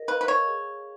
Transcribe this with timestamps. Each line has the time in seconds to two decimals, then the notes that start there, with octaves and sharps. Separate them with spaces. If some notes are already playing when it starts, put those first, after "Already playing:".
Already playing: A#4 D#5
0.08 B4 F5
0.21 B4
0.28 C#5
0.47 G#4